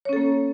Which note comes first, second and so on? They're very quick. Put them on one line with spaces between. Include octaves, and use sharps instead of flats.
C#5 C#4 A4 A#3